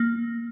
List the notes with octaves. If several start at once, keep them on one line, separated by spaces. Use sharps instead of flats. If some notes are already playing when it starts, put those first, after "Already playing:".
Already playing: A#3